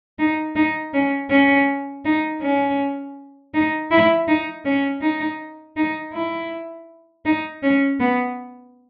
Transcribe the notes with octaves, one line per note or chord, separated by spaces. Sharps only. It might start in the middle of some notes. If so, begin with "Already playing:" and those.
D#4
D#4
C#4
C#4
D#4
C#4
D#4
E4
D#4
C#4
D#4
D#4
E4
D#4
C#4
B3